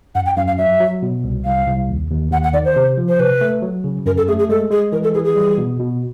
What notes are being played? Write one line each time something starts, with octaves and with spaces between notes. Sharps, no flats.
F#2 F#5
G5
F#2 F5
F5
F#3 E5
F#3
B2
C2
C2 F5
C2
D#2
D#2
D#2 F#5
F#5
D#3 D5
C5
C3
F3
C5
C3 B4
A3
F#3
C#3
F#2 A#4
A4
A3 G#4
G#4
G#3 A4
G#3 G#4
E3 A#4
A4
E3 G#4
G#4
G3
B2
B2